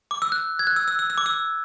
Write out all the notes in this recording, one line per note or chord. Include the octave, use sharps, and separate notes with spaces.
D6
E6
F#6
G#6
F#6
E6
E6
E6
E6
D6
E6